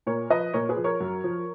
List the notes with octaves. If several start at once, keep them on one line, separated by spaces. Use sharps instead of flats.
A#2 A#4 C#5
F3 B4 D#5
A#2 A#4 C#5
G#4 B4
F3
A#4 C#5
F#2
F3